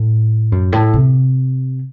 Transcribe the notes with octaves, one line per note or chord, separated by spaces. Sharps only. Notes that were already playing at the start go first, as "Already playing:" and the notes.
Already playing: A2
F#2
A2
C3